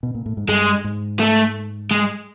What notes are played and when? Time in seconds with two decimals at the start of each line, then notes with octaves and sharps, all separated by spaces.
0.03 B2
0.15 A#2
0.26 A2
0.37 G#2
0.48 G2 G#3
0.84 G#2
1.20 A3
1.91 G#3